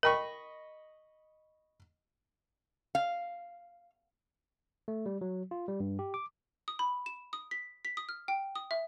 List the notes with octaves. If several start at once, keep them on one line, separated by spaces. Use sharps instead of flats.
A#4 D#5 G5 B5 C#6
F5
A3
G3
F#3
F4
G3
G2
G4
D6
D#6
B5
E7
D#6
B6
B6
D#6
F6
G5
D#6
E5